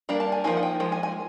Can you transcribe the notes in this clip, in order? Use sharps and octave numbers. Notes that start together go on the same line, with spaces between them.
G3 A#3 D4 A#5
A5
G#5
F3 A#3 D#4 G#5
F#5
G5
F3 G#3
G#5
G#5